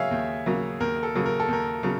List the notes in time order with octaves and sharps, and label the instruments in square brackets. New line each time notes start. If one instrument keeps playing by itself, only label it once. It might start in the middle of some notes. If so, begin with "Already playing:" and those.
Already playing: [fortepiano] C#3 F#3 A#3 [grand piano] G#4 C#5 E5 F5
[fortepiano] D#2
C#3 F#3 A#3
[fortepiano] D#2 [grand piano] A#4
[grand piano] A4
[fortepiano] C#3 F#3 A#3
[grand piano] A#4
A4
[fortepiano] D#2 [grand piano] A#4
[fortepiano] C#3 F#3